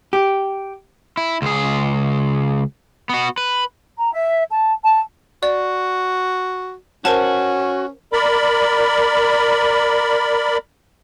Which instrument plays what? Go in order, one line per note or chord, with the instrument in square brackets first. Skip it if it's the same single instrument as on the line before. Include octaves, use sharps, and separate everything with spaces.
[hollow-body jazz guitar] G4
[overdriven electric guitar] E4
C#2 G#4
B3 F#4
B4
[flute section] A#5
E5
A5
A5
[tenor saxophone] F#4 [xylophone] D5
[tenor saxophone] C#4 [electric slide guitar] F#4 [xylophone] A#4 C5 A5
[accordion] A#4 D5 B5